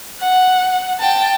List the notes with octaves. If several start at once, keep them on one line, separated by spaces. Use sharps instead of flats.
F#5
G5 A5